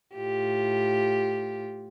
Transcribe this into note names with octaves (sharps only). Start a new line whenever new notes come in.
A2 F4 G4